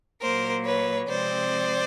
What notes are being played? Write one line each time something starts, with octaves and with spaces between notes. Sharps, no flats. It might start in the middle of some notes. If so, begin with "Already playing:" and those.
A#2 F#3 A#3 A#4 C5
B4 C#5
C3 F3 G#3 C4 C5 D5